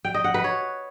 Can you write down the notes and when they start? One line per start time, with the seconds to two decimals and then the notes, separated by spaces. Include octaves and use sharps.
0.05 G5
0.14 D#5
0.24 F#5
0.34 B4
0.44 C#5